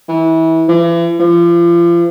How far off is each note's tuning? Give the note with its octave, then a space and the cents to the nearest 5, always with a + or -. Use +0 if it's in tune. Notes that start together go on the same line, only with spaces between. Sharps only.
E3 -25
E3 +40
F3 -35